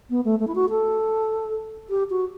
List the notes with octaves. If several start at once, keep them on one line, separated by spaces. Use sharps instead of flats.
B3
A3
A3
E4
F#4
A4
G4
F#4